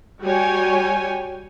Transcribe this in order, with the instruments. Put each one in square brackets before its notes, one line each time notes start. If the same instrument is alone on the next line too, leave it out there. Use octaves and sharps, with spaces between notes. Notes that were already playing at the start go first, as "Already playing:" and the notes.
[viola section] G3 F#4 C#5 G5 G#5